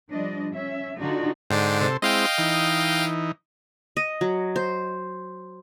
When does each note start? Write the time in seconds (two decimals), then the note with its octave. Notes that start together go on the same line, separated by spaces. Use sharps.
0.12 F3 G3 D4 D#5
0.53 C#4 E5
0.99 D3 D4 D#4 F4 F#4
1.50 G#2 D3 D4 G5 C6
1.81 C3 A4 C5
2.02 G#3 C4 E4 D#5 F5 G5
2.38 E3 D#4
3.97 D#5
4.21 F#3
4.56 C5